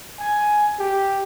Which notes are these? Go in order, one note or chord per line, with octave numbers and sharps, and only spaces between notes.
G#5
G4